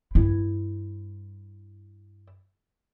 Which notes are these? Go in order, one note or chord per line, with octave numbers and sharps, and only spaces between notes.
G2 E4